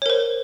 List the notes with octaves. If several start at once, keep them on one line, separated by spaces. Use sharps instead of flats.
A#4 C5 C#5